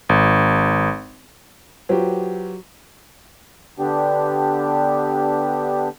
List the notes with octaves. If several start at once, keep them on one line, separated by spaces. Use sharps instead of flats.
G#1
F#3 F4 G4 B4 C5
D3 B3 D4 G4